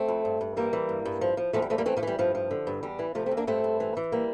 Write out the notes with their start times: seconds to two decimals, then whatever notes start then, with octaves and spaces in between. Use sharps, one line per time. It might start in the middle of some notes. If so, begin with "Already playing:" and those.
Already playing: A3 C4
0.08 F2
0.25 G2
0.41 G2
0.57 E3 G3 A#3
0.73 E3
0.89 G2
1.05 G2
1.21 F3
1.37 F3
1.53 E2 F3 A3
1.62 G3
1.70 E2 F3 A3
1.78 G3 A#3
1.86 E3 A3 C4
1.96 F3 A3
2.03 E3 G3
2.19 G2 F3
2.35 F3
2.51 D3
2.67 G2
2.83 E2 G3
2.99 E3
3.15 C3 F3 A3
3.26 A3 C4
3.31 E2
3.37 A#3 D4
3.47 G2 A3 C4
3.64 G2
3.80 E3
3.97 E3
4.12 G3 A#3